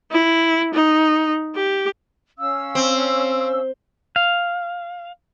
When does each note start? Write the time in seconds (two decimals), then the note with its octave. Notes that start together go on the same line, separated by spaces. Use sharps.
0.11 E4
0.74 D#4
1.56 G4
2.38 C#4 F5 E6
2.75 C4
4.16 F5